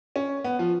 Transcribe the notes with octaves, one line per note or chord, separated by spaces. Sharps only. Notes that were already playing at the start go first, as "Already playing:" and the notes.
C#4
B3
F3